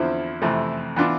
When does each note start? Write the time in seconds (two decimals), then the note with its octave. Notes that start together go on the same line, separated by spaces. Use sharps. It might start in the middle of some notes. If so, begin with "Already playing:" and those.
Already playing: E2 D3 F3 C4 E4
0.42 F2 C3 E3 A3 C4
0.96 E3 B3 D4 F4